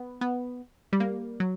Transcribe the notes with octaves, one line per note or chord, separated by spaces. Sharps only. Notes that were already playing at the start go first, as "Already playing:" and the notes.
Already playing: B3
B3
G3
A#3
F#3